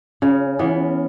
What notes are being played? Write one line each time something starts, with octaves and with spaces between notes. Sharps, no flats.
C#3 C#4
E3 B3